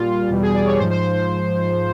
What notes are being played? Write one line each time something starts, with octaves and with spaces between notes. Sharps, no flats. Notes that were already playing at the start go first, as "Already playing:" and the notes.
Already playing: A#2 G3 F4
E2 B2 G3
G#4
D5
C#5
G#2 F3 C5
C5